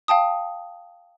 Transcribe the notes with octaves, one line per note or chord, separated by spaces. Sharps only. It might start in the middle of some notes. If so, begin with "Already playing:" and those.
F5 G5 A5 D#6